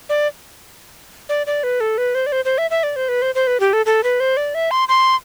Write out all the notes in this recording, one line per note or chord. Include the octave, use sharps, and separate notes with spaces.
D5
D5
D5
B4
A4
B4
C5
D5
C5
C5
E5
E5
D5
C5
B4
C5
C5
B4
G4
A4
A4
B4
C5
D5
E5
C6
C6